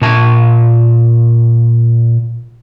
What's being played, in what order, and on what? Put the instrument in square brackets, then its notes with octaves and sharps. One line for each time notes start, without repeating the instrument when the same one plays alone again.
[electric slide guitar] A#2 A5